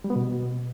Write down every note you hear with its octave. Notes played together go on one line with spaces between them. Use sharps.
G3
B3
B2